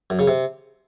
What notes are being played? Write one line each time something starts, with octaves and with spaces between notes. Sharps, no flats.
F#2
C#3
C3